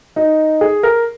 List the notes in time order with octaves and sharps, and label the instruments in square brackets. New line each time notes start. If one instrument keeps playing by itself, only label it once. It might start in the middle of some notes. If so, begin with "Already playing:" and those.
[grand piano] D#4
G#4
A#4